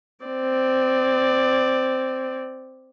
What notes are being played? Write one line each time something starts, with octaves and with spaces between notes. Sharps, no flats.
C4 D5